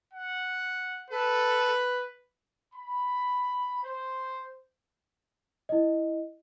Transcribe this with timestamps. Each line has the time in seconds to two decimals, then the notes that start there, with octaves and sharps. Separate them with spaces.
0.13 F#5
1.10 A4 B4
2.74 B5
3.83 C5
5.69 E4 D#5